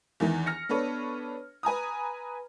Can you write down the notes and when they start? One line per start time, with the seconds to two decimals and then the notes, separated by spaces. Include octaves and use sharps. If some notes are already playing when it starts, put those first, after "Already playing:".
0.20 E2 D#3 E3
0.46 F6 A#6 C#7
0.69 B3 D4 A4 B4 C#5
1.63 B4 G#5 A#5 D#6